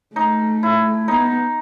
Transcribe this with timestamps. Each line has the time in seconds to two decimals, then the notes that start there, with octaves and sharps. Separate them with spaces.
0.16 A3 D#4
0.63 E4
1.08 B3 D#4